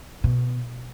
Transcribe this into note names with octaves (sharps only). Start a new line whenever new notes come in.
B2